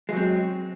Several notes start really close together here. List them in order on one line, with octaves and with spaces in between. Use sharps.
G#3 F#3 C4